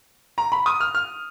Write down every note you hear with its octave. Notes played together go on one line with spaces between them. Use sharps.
A#5
B5
D#6
F6
F6